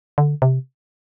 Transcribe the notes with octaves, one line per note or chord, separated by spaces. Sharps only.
D3
C3